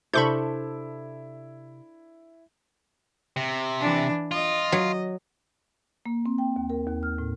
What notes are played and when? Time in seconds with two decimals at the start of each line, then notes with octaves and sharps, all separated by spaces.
0.13 C3 D4 E4 A4 C5 B5 C#6 G6
3.36 C3
3.80 E3 D4
4.31 F4 D#5
4.72 F#3
6.06 A#3
6.26 C4
6.38 G5
6.56 D#2
6.70 A#4
6.88 D#2
7.03 F6
7.18 A2